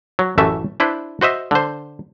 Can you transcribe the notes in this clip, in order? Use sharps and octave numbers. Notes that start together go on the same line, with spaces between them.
F#3
A1 F#2 E3 A3 C#4 E5
D4 E4 B4 C5
F#4 C5 D#5 E5
D3 C5